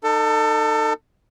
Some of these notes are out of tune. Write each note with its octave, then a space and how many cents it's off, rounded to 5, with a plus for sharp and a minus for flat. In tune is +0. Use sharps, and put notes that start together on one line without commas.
D#4 -25 A4 +25